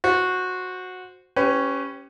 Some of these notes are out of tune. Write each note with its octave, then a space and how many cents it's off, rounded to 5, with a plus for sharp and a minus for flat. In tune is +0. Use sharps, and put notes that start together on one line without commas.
F#4 -10 C5 +0
C#4 +0 G4 +0 B4 +35